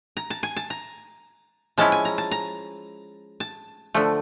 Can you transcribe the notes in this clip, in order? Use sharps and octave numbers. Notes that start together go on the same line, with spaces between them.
A#5
A5
G#5
A5
A#5
F3 G#3 C#4 E4 A5
G#5
A#5
A5
A#5
A5
D3 F3 A3